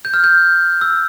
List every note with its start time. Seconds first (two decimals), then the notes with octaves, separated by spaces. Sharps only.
0.05 G6
0.14 F6
0.24 G6
0.81 E6